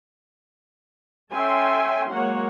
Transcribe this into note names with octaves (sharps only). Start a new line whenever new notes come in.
C#4 A4 E5 G5 G#5 C6
F#3 G#3 A#3 C#5 F#5